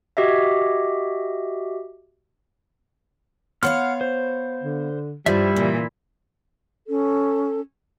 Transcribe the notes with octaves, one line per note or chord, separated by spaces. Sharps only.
F#4 G4 D#5 E5
B3 C#5 F5 F#5 C6 F6
C5
D3
G2 F3 G3 E4 D5 E5
A#2 C#3 E3
C#4 A4